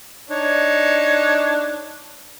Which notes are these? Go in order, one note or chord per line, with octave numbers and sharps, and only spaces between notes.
D4 D#4 C#5